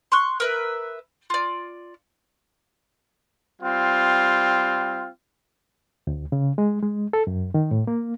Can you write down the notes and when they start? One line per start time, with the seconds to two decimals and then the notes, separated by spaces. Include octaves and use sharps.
0.12 C6 C#6 F#6
0.40 A#4 B4 E5
1.30 F4 D5
3.62 G3 C4 F4
6.07 D2
6.32 C#3
6.58 G#3
6.83 G#3
7.13 A4
7.27 F#2
7.54 D#3
7.71 A2
7.87 A#3